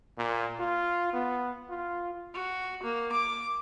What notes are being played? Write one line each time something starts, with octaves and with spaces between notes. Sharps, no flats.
A#2
F4
B3
F4
F#4
A#3
D6